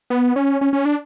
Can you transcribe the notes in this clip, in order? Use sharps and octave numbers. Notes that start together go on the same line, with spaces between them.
B3
C#4
C#4
C#4
D4